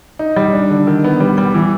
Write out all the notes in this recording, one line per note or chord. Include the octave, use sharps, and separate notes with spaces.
D#4
G3
D4
D3
D#3
B3
G3
G3
E3